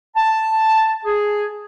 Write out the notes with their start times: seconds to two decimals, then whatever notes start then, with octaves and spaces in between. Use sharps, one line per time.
0.17 A5
1.04 G#4